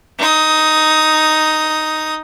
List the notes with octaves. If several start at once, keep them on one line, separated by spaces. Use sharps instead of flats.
D#4 D#6